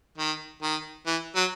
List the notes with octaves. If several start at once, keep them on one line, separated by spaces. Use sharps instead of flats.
D#3
D#3
E3
F#3